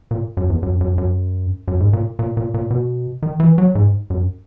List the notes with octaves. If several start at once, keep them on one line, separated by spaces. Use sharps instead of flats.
A#2
F#2
E2
F#2
F#2
F#2
F#2
G#2
A#2
A#2
A#2
A#2
B2
D#3
E3
F#3
G#2
F#2